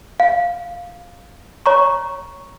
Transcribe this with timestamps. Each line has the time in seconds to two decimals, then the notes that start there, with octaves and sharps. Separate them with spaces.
0.20 F5
1.66 C#5 A#5 C#6